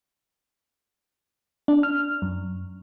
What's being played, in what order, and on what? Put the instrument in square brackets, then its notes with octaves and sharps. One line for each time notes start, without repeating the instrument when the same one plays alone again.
[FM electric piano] D4
F6
F#2